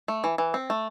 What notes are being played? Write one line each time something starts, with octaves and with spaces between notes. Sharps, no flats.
A3
E3
E3
C4
A3